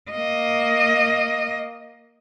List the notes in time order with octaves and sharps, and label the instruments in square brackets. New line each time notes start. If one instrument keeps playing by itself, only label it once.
[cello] A#3 D#5